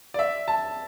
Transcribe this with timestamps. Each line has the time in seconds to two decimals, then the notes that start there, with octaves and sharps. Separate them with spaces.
0.14 D5
0.19 E5
0.48 A5